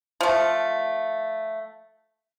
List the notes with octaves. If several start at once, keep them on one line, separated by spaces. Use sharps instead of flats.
F3 A3